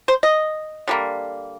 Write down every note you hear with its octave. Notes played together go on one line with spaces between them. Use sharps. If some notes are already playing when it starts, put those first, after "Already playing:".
C5
D#5
D3 G3 A#3